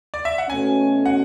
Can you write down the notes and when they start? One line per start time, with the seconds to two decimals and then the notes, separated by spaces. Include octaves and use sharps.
0.14 D5
0.25 E5
0.38 F#5
0.50 B2 A3 C#4 G#5
1.06 F#5